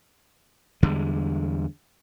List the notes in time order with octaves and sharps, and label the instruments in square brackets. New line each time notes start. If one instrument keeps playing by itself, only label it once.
[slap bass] E2 D3 G3 G#3